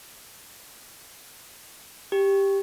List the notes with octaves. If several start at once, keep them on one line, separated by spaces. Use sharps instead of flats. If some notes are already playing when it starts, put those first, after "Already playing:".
G4